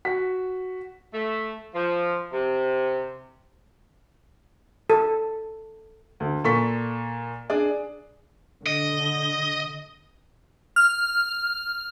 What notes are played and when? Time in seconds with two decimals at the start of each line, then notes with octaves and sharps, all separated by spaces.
0.05 F#4 B6
1.14 A3
1.75 F3
2.32 C3
4.90 A4
6.20 D2
6.44 A#2 A4 C#6 B6
7.50 D4 G#4 D5
8.66 D3 D#5
10.76 F6